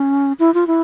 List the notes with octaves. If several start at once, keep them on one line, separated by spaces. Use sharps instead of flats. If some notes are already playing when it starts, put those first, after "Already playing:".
Already playing: C#4
E4
F4
E4